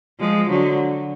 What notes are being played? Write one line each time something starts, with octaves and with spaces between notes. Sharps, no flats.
F3 G#3
D3 F#3